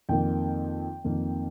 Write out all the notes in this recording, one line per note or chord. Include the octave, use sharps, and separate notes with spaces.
F2 D#3 A#3 G5
F2 D#3 A#3